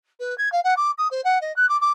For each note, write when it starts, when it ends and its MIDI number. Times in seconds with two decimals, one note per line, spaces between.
0.20 0.37 71
0.38 0.51 92
0.52 0.60 77
0.64 0.74 78
0.77 0.91 86
0.98 1.08 87
1.11 1.21 72
1.24 1.41 78
1.41 1.54 75
1.56 1.68 90
1.69 1.79 86
1.81 1.92 86